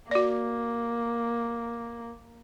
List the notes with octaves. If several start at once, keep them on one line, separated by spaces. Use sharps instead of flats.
A#3 F#4 D5